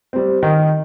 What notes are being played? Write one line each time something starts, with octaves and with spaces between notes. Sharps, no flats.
G3 C4
D#3